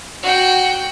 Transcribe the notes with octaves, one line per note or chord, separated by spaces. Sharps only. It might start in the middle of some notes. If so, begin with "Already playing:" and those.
F#4 G5